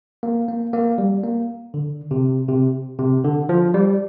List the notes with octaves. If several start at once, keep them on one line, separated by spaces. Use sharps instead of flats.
A#3
A#3
A#3
G3
A#3
D3
C3
C3
C3
D3
F3
G3